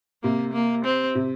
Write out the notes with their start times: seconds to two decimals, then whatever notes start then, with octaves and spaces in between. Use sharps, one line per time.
0.23 C3 A#3
0.53 A#3
0.85 C4
1.15 C3